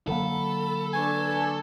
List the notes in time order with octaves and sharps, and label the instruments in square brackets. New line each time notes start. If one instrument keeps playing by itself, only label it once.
[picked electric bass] D3 F#3 A#3 [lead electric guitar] A4 [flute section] B5
[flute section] D4 B4 C#6 [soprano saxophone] G#5